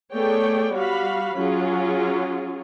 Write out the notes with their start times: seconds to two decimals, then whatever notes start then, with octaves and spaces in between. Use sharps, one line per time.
0.14 A3 B3 G#4 C#5 D5 G5
0.74 G3 F#4 F5 B5
1.35 F#3 C#4 F4 G#4